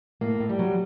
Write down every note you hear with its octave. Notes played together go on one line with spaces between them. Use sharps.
A2 A#3
A2
G3
F#3